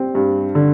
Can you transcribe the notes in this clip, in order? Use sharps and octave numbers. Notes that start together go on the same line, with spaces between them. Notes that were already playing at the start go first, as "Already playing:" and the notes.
Already playing: G3 C4
G2
D3